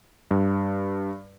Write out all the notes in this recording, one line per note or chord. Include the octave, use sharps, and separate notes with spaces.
G2